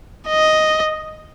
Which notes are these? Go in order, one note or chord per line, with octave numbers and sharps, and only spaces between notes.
D#5